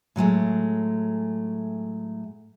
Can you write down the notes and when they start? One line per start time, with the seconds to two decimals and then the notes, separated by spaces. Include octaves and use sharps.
0.16 A2 F#3 G#3 A3